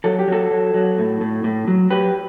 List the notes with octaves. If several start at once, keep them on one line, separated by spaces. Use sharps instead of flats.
F#3 A4
G4
F#3 F#4 A4
F#3
F#3
A2
A2
A2
F#3
F#3 G4 B4